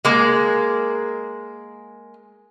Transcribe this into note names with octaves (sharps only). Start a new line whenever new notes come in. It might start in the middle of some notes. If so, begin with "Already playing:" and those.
G#3 A#3